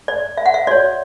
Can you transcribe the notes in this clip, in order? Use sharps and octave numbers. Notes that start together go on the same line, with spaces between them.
D5
E5
F#5
E5
F#4 C#5 D5